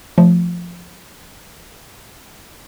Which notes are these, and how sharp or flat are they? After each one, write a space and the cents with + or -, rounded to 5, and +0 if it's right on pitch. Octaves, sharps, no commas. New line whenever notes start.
F3 +0 A3 +0